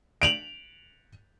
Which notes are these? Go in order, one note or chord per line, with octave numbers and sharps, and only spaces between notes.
D7 F7 F#7